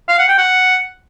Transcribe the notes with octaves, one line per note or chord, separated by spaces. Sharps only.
F5
F#5
G5
F#5